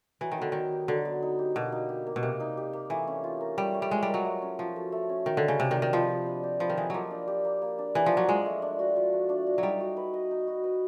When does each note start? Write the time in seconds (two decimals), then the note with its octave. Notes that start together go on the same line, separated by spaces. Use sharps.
0.21 E3 F#3
0.32 D#3
0.38 D3 B3
0.52 D#3 D#4
0.72 G4
0.88 D3 F#3
1.05 B3
1.23 D#4
1.39 G4
1.55 B2 A#3
1.72 D#4
1.89 G4
2.07 A#3
2.16 B2
2.23 C3 A#3
2.40 D#4
2.57 G4
2.73 A#3
2.90 E3 A3
3.08 C#4
3.24 F4
3.41 A#4
3.58 G3 A3
3.74 C#4
3.82 G3
3.91 G#3 F4
4.03 G3
4.08 A#4
4.14 F#3
4.25 A3
4.42 C#4
4.59 F3 F#4
4.76 A4
4.92 A3
5.09 C#4
5.26 D#3 F#4
5.37 D3
5.43 A4
5.48 C#3
5.59 C3 D4
5.71 D#3
5.76 G4
5.82 D#3
5.93 F3 B4
6.09 D#5
6.26 D4
6.44 G4
6.60 F3 B4
6.70 D#3
6.78 E3 D#5
6.90 F3 F#3 A#3
7.11 D4
7.28 G4
7.45 A#3
7.62 A#3
7.79 D4
7.95 E3 G4
8.06 F3 A#3
8.17 F#3
8.28 F3 G#3
8.46 A3
8.62 D4
8.79 F#4
8.96 F3
9.13 A3
9.29 D4
9.47 F#4
9.58 F#3
9.63 G3 D#4
9.81 F#4
9.97 B4
10.14 D#5
10.31 D#4
10.47 F#4
10.64 B4